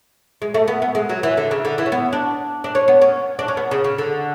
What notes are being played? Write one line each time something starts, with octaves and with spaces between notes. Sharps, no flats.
G#3
A3
B3
B3
G#3
F#3
E3
D3
C#3
D3
E3
C#4
B3
D4
D4
C#4
B3
C#4
D4
C#4
B3
C#3
C#3
D3